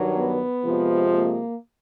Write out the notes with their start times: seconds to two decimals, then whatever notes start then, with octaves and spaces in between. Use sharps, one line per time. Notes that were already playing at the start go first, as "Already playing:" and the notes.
Already playing: G2 D#3 F#3
0.14 B3
0.63 F2 C3 F3 G#3
1.11 A#3